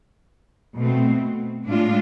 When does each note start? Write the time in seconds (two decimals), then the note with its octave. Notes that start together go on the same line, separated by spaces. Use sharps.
0.76 B2 A3 C4
1.65 A2 G#3 D4 F4